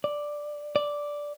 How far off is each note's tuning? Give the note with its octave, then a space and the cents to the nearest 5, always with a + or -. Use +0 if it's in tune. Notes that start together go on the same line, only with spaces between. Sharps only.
D5 +5
D5 -5